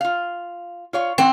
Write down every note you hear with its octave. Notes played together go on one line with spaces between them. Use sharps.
F4 F5
F4 C#5 F5
E3 C4 F#5